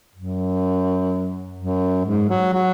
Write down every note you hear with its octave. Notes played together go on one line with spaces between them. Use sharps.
F#2
F#2
G#2
F#3
F#3